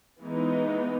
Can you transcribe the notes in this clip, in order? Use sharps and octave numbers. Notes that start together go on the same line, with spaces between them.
E3 G#3 B3 D#4